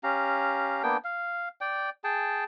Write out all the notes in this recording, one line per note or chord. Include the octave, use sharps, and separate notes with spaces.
C#4 G4 F5 A#5
A#3 B3 D4 G5
F5
D5 G5
G#4 G5 A5